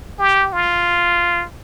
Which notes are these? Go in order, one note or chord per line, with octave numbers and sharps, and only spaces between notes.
G4
F4